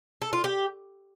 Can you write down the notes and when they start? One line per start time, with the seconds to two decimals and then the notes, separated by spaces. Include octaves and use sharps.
0.22 A4
0.33 F4
0.44 G4